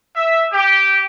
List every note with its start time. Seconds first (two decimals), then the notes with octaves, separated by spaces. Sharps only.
0.15 E5
0.51 G4